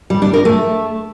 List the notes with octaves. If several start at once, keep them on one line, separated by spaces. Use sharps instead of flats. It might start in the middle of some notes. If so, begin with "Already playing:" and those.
G3
D4
A#4
A3